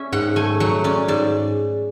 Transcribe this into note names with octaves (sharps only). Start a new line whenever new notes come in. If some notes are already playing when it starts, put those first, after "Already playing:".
Already playing: C#4 E5
G#2 F#5
A3 G#5
F#3 F#5
C#4 D5
G#2 D5